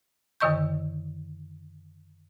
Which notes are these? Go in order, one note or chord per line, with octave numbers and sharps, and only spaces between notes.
F#2 D3 D#3 D#5 C#6 G6